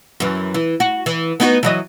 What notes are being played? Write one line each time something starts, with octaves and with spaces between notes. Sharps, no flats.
F#2 E3
E3
F#4
E3
B3 D#4 F#4
E3 F#3 D#5